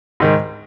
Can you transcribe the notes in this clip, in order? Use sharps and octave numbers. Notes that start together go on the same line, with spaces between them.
G#2 D#3 G#3